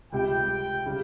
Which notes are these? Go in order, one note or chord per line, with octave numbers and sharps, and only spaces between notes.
C#2 C3 G3 G5
C#3 G3